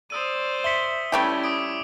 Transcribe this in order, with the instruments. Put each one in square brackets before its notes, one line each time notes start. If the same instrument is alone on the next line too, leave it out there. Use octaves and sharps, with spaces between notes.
[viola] C5 D5 [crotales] D#6 E6 D#7
[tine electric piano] E5 C6 B6 [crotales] C#7 F#7 G7
[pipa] G3 A3 G4 [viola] C#4 E4
[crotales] D6 D#6 D7